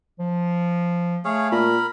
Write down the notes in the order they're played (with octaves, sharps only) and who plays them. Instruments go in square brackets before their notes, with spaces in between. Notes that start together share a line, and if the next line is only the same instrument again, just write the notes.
[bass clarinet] F3
[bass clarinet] A3 [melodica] G#4 C#5 F5
[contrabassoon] A#2 [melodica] A#4 B5